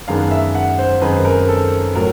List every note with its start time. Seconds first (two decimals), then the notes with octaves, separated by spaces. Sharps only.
0.08 F#2 D#3 G#3 B3 D4 F5
0.31 E5
0.55 F#5
0.79 C5
1.02 F#2 D#3 G#3 C4 D#4 B4
1.25 A#4
1.48 A4
1.95 A2 F#3 A#4